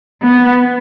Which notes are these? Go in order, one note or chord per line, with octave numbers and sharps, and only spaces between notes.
B3